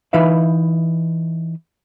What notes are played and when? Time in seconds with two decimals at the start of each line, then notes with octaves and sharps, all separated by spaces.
0.13 E3 D#4 B4 E5 F5